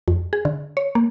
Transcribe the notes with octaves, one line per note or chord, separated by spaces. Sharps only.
F2
G#4
D3
C#5
A#3